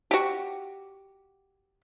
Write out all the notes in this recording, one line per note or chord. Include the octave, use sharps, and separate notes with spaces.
F#4 G4